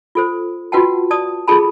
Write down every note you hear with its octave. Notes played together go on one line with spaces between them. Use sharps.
F4 A4 C5
F4 F#4 B4 F#5 G5 A5
D5 A5 D#6
F4 G#4 A4 A5 B5